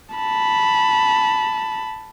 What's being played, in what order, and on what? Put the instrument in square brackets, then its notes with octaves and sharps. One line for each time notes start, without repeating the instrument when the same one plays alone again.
[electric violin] A5 B5